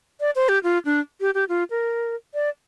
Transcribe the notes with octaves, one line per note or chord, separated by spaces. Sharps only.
D5
C5
G4
F4
D4
G4
G4
F4
A#4
D5